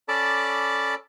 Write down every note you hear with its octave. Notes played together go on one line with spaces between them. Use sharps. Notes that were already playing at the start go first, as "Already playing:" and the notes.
C#4 A4 D5 A5 B5 D6